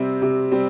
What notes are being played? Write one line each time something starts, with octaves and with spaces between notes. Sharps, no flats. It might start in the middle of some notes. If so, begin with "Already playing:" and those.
Already playing: C3 G3 C4
C3
G3 C4